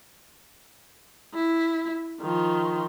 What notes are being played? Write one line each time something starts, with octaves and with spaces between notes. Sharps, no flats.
E4
D#3 F3